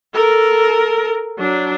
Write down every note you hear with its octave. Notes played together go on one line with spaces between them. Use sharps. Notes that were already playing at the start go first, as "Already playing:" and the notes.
A4 A#4
F#3 D4